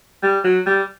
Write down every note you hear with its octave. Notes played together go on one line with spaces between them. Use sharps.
G3
F#3
G3